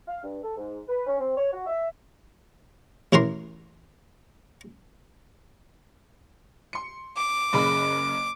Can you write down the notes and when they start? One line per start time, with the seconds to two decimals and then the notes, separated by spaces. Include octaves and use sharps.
0.07 F5
0.23 G2
0.43 A4
0.57 G#2
0.88 B4
1.07 C#4
1.19 C4
1.37 C#5
1.53 F#4
1.67 E5
3.13 A1 E3 A#4 C6
6.73 C6 C#7
7.17 D6
7.53 F#1 C#3 B5